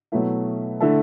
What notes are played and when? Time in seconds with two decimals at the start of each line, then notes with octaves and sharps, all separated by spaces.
0.12 B2 F#3 A3 E4
0.80 D3 A3 E4 A4